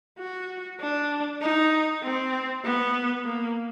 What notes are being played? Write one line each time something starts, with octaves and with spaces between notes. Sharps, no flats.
F#4
D4
D#4
C4
B3
A#3